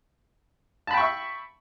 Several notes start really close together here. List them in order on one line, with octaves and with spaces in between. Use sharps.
A5 B5 G5 C#6 E5